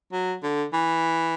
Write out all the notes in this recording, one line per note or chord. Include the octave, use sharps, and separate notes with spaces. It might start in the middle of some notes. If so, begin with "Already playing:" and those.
F#3
D3
E3